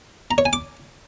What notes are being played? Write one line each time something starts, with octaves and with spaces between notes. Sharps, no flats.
A#5
C#5
G#5
D6